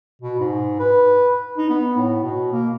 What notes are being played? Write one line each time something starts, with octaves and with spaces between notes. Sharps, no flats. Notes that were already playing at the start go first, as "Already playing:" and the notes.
B2
G#2
B4
D#4
B3
A2
B2
A#3